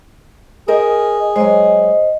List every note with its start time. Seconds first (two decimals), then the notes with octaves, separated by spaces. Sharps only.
0.68 G#4 A#4 C5 D#5
1.36 F#3 G#3 C5 D#5